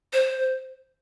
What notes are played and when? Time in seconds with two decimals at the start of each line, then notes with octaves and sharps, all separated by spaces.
0.13 C5